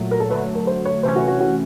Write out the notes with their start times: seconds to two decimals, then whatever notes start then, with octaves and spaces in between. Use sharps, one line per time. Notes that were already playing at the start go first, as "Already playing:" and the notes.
Already playing: A#2 F#3 A3
0.11 A#4
0.20 A4
0.29 D3 F#3 A3 B4
0.55 A#4
0.67 C5
0.85 C#5
1.03 C3 E3 A3 C#4 C5
1.16 F#4
1.28 F#4
1.40 F#4